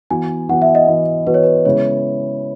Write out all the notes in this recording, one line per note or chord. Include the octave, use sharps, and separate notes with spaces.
E3 B3 F#4 G#5
E3 B3 F#4 F#5
E5
D#5
E3 B3 F#4
E3 B3 F#4 B4
C#5
B4
C#3 G#3 B3 E4 C#5